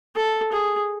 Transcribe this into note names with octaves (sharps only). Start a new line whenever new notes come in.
A4
G#4